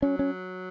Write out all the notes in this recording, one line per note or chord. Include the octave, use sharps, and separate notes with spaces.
F#3 C#4
C#4